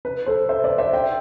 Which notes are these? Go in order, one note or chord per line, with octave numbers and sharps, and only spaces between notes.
B4
A4 C5
C5 E5
B4 D5
C5 E5
E5 G5